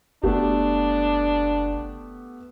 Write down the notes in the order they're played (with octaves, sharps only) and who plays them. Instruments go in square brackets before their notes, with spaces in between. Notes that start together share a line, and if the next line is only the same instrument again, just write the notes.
[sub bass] F#1 [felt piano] A3 B3 G4 [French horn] D4